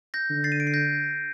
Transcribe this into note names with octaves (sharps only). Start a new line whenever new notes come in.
G6 A#6
D3
A6 C7
D#7
D7
C7
G6 A#6